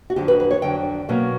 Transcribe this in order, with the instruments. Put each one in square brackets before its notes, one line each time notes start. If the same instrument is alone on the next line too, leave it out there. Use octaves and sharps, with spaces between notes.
[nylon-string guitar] F#4
F2 D3 F#3 G4
B4
B4
C#5
F2 D3 F#3 G5
B2 F#3 A#3 C#4